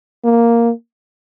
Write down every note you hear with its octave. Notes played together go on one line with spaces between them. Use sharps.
A#3